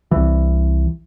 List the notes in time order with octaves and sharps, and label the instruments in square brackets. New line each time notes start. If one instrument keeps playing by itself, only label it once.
[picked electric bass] C2 E3